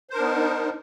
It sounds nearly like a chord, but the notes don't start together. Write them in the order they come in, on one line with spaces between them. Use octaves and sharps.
C5 A#4 D4 B3 D#4